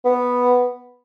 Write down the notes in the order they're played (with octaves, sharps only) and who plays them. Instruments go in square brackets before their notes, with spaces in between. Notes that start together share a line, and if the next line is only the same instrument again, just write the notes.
[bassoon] B3